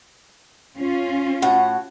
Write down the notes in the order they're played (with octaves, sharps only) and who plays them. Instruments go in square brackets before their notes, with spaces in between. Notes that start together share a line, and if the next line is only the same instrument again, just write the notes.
[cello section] C#4 F4
[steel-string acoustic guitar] A2 F#4 F#5